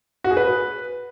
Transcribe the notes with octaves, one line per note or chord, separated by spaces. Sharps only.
F#4
G#4
B4